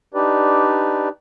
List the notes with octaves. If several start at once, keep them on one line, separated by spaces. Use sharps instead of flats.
D4 D#4 G4 B4 D5